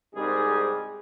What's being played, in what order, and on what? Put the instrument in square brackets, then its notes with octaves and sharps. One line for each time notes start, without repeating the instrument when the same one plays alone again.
[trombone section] C2 G#2 G3 D#4 G#4